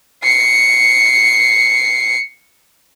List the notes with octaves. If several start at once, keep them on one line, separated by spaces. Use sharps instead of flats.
C7 C#7